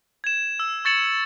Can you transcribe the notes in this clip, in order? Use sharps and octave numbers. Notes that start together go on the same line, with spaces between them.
G#6 E7
E6
C#6 G#6 A6 C#7 E7 F#7